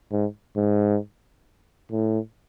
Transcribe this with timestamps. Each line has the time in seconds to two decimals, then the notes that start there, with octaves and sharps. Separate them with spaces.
0.12 G#2
0.57 G#2
1.92 A2